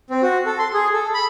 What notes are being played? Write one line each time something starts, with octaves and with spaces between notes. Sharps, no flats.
C4
F#4
A4
C6
G#4
A4
B5